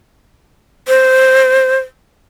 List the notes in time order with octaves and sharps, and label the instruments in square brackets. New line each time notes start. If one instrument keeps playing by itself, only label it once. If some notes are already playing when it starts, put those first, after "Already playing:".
[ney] C5